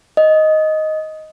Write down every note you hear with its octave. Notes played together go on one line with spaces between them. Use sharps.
D#5